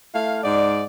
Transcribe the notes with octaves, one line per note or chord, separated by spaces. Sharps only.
A3 E4 F5
G#2 D5